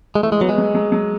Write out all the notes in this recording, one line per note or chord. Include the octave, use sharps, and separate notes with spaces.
G#3
E3 A3
G#3
F#3 B3
G#3
F#3
F#3
F#3